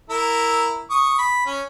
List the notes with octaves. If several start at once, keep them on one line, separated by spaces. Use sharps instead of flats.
E4 A#4
C#6 D#6
B5
C#4